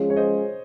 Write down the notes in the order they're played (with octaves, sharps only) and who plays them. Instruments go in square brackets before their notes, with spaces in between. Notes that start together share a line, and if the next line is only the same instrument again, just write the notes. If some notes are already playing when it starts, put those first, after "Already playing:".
Already playing: [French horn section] F3 G#3 C#4 F4 G#4
[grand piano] C#5
C5 D#5